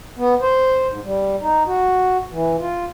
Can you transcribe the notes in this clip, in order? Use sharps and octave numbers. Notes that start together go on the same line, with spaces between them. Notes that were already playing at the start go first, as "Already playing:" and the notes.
B3
C5
G#2
G3
D#4
F#4
E3
F4